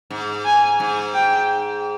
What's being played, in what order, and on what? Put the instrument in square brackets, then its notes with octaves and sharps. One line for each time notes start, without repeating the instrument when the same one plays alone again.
[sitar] G#2
[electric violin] G#5
[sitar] G#2
[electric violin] G5